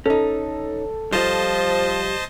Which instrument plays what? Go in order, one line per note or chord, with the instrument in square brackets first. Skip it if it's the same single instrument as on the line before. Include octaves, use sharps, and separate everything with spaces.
[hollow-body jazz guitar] C#4 D#4 [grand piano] A4
[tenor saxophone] F3 [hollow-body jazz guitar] G3 F4 [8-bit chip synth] C5 D#5 A5